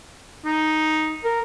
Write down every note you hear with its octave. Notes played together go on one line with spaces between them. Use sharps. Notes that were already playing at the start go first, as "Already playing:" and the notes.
D#4
A#4